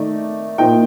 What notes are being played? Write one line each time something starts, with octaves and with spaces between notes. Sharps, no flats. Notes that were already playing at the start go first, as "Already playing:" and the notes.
Already playing: D#3 A3 D#4 D5
A#2 F3 A#3 D#4 G5